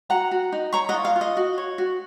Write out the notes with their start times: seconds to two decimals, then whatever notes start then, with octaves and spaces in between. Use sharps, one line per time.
0.10 F#4 F#5 A#5
0.31 F#4
0.52 D#4
0.73 C#5 A#5 C#6
0.89 D#5 F#5
0.94 F4
1.05 F5
1.16 F4
1.21 D#5
1.37 F#4
1.58 C#5
1.78 F#4